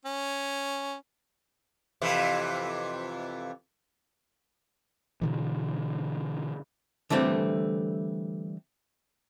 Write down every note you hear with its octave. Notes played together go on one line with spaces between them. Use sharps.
C#4
F2 C3 E3
B2 D3 E3
D3 E3 G3 A3 C4